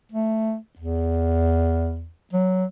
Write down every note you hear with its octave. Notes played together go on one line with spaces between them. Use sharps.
A3
E2
F#3